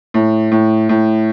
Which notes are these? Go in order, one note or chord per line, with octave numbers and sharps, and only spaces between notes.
A2
A2
A2